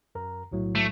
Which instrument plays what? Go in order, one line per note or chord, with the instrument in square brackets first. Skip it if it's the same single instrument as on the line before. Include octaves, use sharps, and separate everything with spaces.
[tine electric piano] F#2 A#4 A#5
B1 A2 F#3
[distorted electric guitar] A3